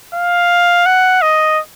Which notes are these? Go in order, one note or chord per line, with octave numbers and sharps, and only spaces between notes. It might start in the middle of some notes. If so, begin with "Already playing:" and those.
F5
F#5
D#5